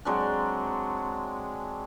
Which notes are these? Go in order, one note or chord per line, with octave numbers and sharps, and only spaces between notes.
F#3 G#3 C4 D4